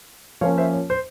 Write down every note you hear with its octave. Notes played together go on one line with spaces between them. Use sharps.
F3 A#3 C#4 C#5 F5
C5 E5
C#5
C5